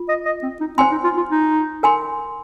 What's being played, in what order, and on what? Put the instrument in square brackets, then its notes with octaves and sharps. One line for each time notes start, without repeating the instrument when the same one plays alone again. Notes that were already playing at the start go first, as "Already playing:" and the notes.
Already playing: [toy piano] F4
[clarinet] D#5
D#5
C4
D#4
[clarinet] C4 [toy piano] C5 G#5 C6
[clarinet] D#4
F4
F4
D#4
[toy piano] A#4 G#5 C6